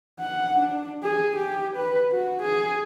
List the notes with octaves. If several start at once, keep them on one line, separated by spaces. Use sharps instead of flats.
F#5
D4
G#4
G4
B4
F#4
G#4